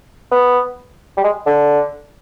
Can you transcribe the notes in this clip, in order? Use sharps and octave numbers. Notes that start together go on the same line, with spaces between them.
B3
G3
G#3
D3